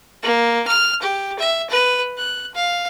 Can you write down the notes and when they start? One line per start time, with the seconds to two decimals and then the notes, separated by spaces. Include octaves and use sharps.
0.23 A#3
0.67 F6
1.02 G4
1.39 E5
1.70 B4
2.17 F#6
2.54 F5